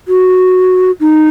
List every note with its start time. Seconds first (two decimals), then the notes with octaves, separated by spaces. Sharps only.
0.08 F#4
1.00 D#4